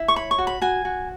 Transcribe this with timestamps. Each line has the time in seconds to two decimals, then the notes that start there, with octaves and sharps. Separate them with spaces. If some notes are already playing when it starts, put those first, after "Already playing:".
Already playing: E4
0.08 C#6
0.16 C#5 B5
0.31 C#6
0.38 F#4
0.47 B5
0.61 F#4 G#5
0.85 F#4